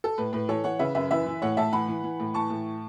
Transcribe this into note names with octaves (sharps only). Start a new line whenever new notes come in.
A4
A2 B4
A2 B4
E3 A4 C#5
E3 C#5 F#5
C#3 B4 E5
F#2 B4 E5
E3 B4 E5
E3
A2 C#5 F#5
A2 E5 A5
E3 F#5 B5
E3
E3
A2
E3 A5 C#6
A2